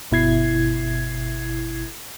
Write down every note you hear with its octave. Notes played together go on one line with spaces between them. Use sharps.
G1 B2 E4 G#6 C7